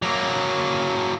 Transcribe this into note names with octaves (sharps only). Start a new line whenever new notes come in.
F#3 A#3